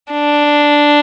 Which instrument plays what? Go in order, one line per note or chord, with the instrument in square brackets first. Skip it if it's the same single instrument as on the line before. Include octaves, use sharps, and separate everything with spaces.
[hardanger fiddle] D4